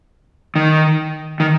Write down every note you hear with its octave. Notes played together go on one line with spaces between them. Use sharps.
D#3
D#3